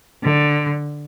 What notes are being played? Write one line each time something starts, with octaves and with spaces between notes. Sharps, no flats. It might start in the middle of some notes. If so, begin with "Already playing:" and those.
D3